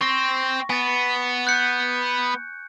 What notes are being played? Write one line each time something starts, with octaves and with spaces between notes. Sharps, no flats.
C4 C#6 A#6
B3 G#5 A6
F#6 G6 C#7